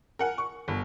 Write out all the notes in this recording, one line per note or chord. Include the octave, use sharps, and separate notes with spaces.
A#4 F#5 G#5
C#6
G1